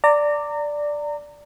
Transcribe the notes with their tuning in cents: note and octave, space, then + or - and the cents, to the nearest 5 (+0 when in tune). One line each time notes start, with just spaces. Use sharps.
D5 +0 A#5 -30